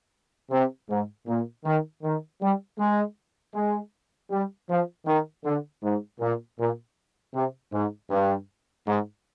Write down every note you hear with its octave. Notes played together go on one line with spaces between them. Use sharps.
C3
G#2
A#2
D#3
D#3
G3
G#3
G#3
G3
F3
D#3
D3
G#2
A#2
A#2
C3
G#2
G2
G#2